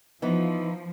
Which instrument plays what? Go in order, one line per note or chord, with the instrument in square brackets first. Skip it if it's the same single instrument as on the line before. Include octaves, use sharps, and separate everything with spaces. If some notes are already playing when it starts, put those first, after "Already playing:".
[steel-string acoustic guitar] E3 B3 D#4 [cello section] F3